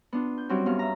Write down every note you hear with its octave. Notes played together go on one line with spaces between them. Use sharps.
B3 D4 F4
G6
F#3 G3 C4 C#4 E4 F#4
G2 B3 F5
E5 A#5